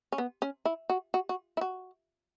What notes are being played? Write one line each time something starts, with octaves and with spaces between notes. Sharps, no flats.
C#4
B3
C#4
E4
F#4
F#4
F#4
E4
F#4